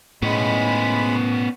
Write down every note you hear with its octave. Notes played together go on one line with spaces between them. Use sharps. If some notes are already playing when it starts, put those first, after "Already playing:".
A2 G#3 B3 C#4 B5